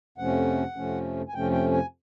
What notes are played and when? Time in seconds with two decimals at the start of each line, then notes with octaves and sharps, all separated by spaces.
0.18 F2 C3 F3 A3 C#4 F#5
0.76 F2 C3 F3 A3 C#4
1.29 G#5
1.34 F2 C3 F3 A3 C#4 G5
1.52 G5
1.72 G#5